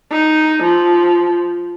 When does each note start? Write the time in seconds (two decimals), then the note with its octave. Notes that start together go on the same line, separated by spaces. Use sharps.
0.11 D#4
0.63 F3